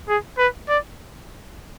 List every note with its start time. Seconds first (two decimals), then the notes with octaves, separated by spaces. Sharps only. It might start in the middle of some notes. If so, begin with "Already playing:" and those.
0.08 G#4
0.38 B4
0.69 D5